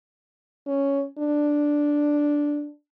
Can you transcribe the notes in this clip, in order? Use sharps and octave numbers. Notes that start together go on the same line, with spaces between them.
C#4
D4